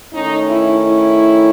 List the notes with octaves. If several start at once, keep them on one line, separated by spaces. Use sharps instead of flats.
D#3 A3 C#4 D#4
E4
E4